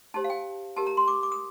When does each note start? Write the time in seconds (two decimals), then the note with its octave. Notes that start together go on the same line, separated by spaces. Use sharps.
0.14 D#4 G4 C5 A5
0.24 F5
0.30 G5
0.76 D#4 G4 A#4 A5
0.87 A#5
0.97 C6
1.08 D6
1.23 D6
1.32 D#6